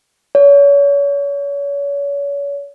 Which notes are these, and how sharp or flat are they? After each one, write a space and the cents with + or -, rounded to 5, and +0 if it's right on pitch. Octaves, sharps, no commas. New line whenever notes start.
C#5 +35